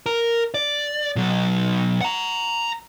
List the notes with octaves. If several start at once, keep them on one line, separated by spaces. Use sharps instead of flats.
A#4
D5
B2 F#3
F#5 A#5